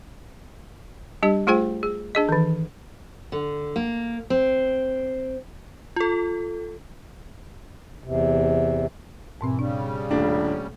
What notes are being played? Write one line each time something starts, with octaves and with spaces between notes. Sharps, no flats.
G3 D4 G4 D#5
A3 F4 G#4 C5 G5
G#4
D4 G#4 D#5
D#3 E3
D3
A#3
C4
F4 A4
E2 C3
G#2 B2 E3 C4
C#3 G3 D4
D#1 A3 D4